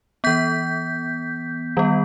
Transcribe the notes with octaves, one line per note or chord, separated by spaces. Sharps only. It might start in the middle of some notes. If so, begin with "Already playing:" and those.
E3 B3 G6 B6
D#3 G3 B3